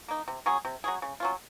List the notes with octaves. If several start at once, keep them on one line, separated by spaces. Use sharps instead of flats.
A#3 D#4
C3
F#3 C#4 G#4
C3
F#3 C#4 G#4
C#3
F#3 C#4 F4